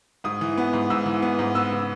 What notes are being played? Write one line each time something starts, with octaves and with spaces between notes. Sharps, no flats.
G#2 D#6
E3
B3
G#2
G#2 E6
E3
B3
G#2
B3 E6
C#3